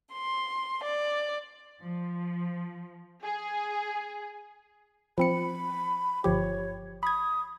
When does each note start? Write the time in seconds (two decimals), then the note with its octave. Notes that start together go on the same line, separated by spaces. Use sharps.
0.13 C6
0.83 D5
1.82 F3
3.23 G#4
5.18 F3 C4 B5 C#7
6.24 G1 F3 G4 C#5
7.03 B5 D#6 G#6